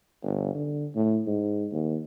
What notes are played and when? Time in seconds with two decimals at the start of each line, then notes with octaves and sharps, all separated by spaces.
0.23 G1
0.55 D3
0.95 A2
1.26 G#2
1.72 D#2